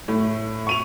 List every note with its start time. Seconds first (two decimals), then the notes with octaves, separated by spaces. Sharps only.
0.08 A2 A3
0.67 C#6 D#7 F7